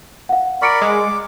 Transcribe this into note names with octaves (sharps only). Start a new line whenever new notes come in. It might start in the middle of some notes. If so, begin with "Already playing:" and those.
F5 F#5
A#4 D5 B5 C#6 C#7 D7
G#3 D6